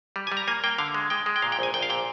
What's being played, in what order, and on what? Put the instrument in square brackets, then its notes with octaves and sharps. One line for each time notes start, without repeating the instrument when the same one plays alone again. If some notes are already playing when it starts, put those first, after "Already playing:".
[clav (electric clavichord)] G3
G#5
G3
A#5
A#3 G#5
A#3 G5
D3 F5
G#3
G#3 G5
G#3
G5
A#2 F5
G5
A#1 G#5
A#1 G5
F5
A#2 G5